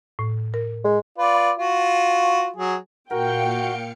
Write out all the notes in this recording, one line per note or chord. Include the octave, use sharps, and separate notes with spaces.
A2
A#4
G#3
F4 B4 D5
F4 F#4
F#3 G#4
A#2 F#4 A#4 F5 G5 C#7